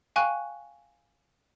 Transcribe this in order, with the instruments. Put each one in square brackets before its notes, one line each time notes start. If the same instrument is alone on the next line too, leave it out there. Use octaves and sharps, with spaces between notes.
[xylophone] F5 G5 G#5 C#6 F#6